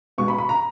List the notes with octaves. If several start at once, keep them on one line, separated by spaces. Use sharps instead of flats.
B2 G#3 B3 C#6
B5
B5
A#5